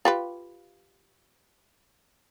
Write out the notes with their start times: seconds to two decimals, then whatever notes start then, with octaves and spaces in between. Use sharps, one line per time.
0.05 F4 G4 B4